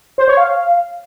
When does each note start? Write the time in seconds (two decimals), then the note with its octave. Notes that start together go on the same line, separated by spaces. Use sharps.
0.18 C5
0.28 C#5
0.37 F5